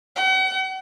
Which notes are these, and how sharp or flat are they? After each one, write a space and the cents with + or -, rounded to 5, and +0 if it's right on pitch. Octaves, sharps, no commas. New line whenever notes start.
F#5 +40